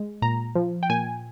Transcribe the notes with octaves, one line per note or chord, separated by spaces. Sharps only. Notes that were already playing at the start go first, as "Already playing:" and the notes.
Already playing: G#3
A#2 A#5
F3
G5
A#2 G#5